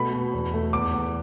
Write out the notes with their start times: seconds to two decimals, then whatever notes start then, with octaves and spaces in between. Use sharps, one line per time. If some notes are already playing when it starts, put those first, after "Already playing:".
Already playing: B2 A3 B5
0.13 B2
0.34 E2
0.53 A3
0.73 E2 D6
0.94 E2